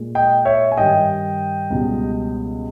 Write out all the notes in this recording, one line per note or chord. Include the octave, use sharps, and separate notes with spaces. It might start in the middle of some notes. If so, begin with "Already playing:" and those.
Already playing: A#2 G#3
D#5 G5
C#5 E5
G#5
G2 D#3 G3 D#5 G5
C#2 B2 G3